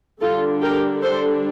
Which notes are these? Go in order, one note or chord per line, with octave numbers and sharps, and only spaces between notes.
D3 G3 D4 F4 A4
G4 A#4
A4 C5